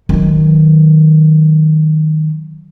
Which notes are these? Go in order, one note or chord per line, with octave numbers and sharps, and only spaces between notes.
D#3 F#3